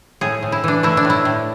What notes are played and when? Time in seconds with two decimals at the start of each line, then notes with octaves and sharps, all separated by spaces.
0.21 A2 G#4
0.42 A2
0.52 E4
0.64 E3 D4
0.83 A3 E4
0.97 D4
1.05 A2
1.10 E4
1.25 A2